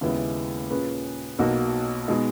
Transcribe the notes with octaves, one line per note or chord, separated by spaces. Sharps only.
D#2 C#3 G#3 B3 E4
A#2 A#3 C#4 G#4 B4
B1 B2 A#3 D#4 F#4
B2 G#3 D#4